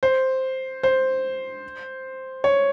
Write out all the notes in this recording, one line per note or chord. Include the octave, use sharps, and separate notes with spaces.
C5
C5
C#5